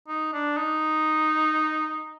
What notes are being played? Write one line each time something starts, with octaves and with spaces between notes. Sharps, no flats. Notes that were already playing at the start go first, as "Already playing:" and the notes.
D#4
D4
D#4